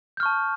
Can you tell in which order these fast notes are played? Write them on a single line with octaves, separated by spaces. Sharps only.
G6 F6 C#6 A5